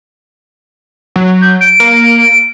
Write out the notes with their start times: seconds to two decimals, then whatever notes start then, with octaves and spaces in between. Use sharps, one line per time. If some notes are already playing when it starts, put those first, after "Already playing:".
1.16 F#3
1.41 G6
1.61 D7
1.80 A#3